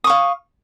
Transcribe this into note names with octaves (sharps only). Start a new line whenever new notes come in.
F5 C#6 D#6